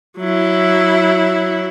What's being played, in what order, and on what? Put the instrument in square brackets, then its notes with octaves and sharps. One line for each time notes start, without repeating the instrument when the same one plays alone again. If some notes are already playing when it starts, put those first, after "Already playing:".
[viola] F#3 E4